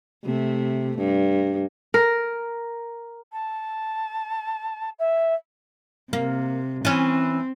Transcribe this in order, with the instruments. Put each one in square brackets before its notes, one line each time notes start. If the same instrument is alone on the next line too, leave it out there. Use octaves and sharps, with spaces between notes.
[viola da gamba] C3 A3
G2
[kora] A#4
[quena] A5
E5
[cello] C3 [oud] A#3
[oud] E3 C#4 [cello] C4